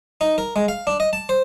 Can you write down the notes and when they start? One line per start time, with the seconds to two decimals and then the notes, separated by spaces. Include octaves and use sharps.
0.21 D#4
0.38 A#4
0.56 G#3
0.68 F5
0.87 D4
1.00 D#5
1.13 A5
1.29 C5